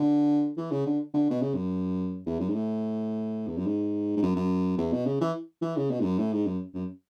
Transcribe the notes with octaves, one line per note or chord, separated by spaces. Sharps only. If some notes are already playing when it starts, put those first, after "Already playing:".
Already playing: D3
E3
C#3
D3
D3
B2
C#3
F#2
E2
F#2
G#2
A2
E2
F#2
G#2
G#2
F#2
F#2
E2
B2
C#3
E3
E3
C#3
B2
G#2
F#2
A2
G#2
F#2
F#2